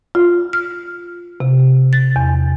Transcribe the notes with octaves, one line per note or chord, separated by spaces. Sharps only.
F4
F6
C3
A6
E2